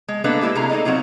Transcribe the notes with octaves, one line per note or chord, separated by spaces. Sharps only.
G#3
A#3 B3 D4 A4 B4 D#5
G#3 E4 G4 B4
C3 A3 D4 G#4 A#5
D#4 A4 A#4 D5 D#5
F#3 C4 D#4 F4